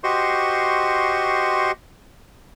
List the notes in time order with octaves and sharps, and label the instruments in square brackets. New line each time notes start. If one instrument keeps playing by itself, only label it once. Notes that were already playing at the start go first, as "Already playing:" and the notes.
[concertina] F#4 G4 C5 D#5 C6 C#6